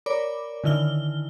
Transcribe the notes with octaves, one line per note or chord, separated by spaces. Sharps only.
A#4 C#5 D5 B5 D6
D3 D#3 E4 F6 G7